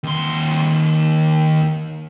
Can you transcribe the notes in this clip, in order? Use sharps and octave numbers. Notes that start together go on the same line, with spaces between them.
D#2 C6